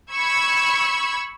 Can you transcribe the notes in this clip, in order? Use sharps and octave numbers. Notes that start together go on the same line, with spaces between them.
B5 C#6 E6 G#6